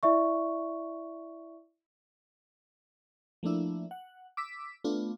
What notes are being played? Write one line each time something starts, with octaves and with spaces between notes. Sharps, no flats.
E4 D5 E5 C#6
F3 A3 A#3 D4 E4
F#5
D6 E6 B6
A3 B3 D4 F4